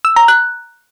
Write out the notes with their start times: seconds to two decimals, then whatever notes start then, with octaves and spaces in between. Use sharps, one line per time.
0.05 E6
0.16 A#5
0.28 F#6